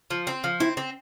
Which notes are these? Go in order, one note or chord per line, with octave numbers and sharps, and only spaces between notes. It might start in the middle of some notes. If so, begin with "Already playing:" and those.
F3
C4
F3
C4 E4
C4